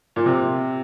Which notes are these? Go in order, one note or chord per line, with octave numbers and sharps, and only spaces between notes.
A#2
C3